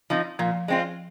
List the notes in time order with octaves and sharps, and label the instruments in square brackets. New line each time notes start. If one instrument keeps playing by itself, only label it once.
[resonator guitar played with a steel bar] F3 C4 D#4
[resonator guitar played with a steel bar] A#2 [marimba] F3
[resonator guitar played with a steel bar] G#3 C4 F4